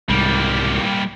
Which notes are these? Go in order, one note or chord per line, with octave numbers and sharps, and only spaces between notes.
C2 G#2 G3 A#3